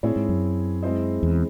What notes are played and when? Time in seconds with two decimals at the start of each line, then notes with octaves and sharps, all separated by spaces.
0.03 A2 C4 E4 G#4 C#5
0.16 G#2
0.29 F#2
0.83 G#3 C4 E4 C5 D#5
1.23 E2